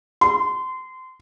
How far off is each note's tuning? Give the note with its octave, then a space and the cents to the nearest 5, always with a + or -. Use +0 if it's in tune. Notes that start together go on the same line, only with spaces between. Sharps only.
C6 -25